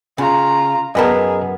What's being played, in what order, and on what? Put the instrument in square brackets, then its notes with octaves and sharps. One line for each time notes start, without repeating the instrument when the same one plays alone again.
[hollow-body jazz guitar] C#3 [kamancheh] F4 A#5
[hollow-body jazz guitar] F#2 B3 A5 [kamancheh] G#4 [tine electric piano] A#4 D#5